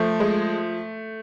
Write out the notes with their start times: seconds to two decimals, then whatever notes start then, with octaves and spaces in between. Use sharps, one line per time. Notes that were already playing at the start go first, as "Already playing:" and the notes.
Already playing: F3 A3
0.20 G#3